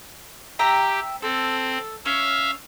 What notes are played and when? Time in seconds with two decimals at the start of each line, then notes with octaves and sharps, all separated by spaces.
0.59 G4 E5 G5 A#5
1.22 C4 A4
2.06 C#4 E5 F5